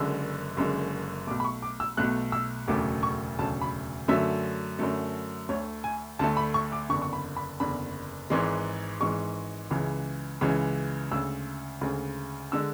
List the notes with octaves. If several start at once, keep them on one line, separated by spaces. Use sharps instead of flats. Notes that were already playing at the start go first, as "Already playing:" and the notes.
Already playing: F#1 F#2 D3 G#3 E6
F#1 F#2 D3 G#3
B1 B2 A3 D6
B5
C#6
D6
E6
B1 B2 A3 F#6
E6
E1 D2 C#3 F#3 A3 D6
C#6
E1 D2 C#3 F#3 A3 A5
B5
F#2 D3 F#3 A3 E5
F#2 D3 F#3 A3
D2 D3 A3 C#5
G#5
D2 D3 A3 A5
B5
C#6
D6
F#1 E2 D3 C#6
C#6
B5
B5
F#1 E2 D3 B5
G#1 G#2 E3 G#3
G#1 G#2 E3 G#3 C#6
C#2 C#3 E3 G#3
C#2 C#3 E3 G#3
D2 C#3 G#3 E6
D2 C#3 G#3
D3 G#3 E6